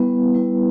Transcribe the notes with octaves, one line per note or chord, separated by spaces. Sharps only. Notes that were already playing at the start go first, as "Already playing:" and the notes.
Already playing: G3 B3 E4 B4
G3 B3 E4 B4